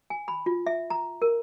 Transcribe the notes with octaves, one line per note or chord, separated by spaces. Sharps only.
G#5
B5
F4
E5
A#5
A#4